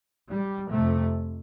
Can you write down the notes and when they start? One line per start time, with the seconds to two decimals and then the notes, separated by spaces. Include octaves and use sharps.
0.31 G3
0.72 F2 C3 A3